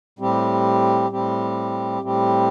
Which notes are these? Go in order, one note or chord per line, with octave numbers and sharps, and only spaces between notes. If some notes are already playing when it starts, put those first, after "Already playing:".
A2 G3 C4 G4
A2 G3 C4 G4
A2 G3 C4 G4